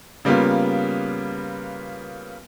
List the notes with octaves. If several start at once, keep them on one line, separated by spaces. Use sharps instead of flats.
C#3 G3 A#3 B3 F4